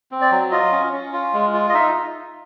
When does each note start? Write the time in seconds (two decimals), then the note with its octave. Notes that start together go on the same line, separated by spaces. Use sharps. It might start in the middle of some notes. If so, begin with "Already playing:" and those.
0.11 C4
0.22 D5
0.31 F#3
0.52 F4 D#5
0.72 C#4
0.93 C#4
1.13 F4
1.33 G#3
1.54 F4
1.69 D#5
1.74 D#4 E5